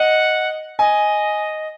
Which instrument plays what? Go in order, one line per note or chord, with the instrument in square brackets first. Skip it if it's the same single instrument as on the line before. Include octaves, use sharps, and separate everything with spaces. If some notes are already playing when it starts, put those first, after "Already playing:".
Already playing: [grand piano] D#5 [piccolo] F#5
[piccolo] D#5 [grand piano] G#5